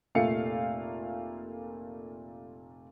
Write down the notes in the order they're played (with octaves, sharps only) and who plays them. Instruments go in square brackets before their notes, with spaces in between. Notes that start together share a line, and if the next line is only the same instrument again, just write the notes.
[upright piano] F1 A#2 A3 A#3 F5 C#7